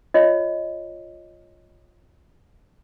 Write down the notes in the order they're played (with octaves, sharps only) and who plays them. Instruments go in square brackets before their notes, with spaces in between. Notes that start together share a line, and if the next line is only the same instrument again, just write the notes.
[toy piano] F4 C#5 D#5